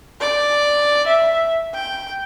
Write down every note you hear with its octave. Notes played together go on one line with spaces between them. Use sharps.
D5
E5
G5